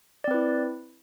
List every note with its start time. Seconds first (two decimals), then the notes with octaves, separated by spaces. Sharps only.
0.24 D5
0.28 C4
0.31 B4
0.34 E4